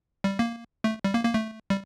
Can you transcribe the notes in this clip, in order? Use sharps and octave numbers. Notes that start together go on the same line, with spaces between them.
G3
A#3
A3
G3
A#3
A#3
A3
G3